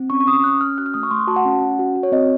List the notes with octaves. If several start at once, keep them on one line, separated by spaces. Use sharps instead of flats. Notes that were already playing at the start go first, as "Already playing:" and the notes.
Already playing: C4
C#4 C#6
C#6
C#4 D#6
C#4 F#6
C#4 F6
F#4 F#6
F6
A3 D#6
C#6
A3 C6
F#4 A5
F#5
C#4
C#4
F#4
F#4
C#5
C4 D#5